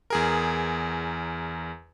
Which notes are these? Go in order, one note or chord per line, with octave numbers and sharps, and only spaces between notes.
E2 G#4 A#4